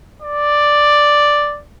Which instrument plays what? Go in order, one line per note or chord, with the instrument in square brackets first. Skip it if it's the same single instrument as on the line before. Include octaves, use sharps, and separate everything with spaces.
[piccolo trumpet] D5